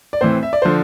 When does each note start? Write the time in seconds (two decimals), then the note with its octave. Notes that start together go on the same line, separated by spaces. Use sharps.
0.13 D5
0.21 A2 E3 C4 C5
0.43 E5
0.53 D5
0.62 D3 F3 C5